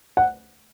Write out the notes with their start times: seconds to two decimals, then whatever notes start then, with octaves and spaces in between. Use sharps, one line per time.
0.17 F#5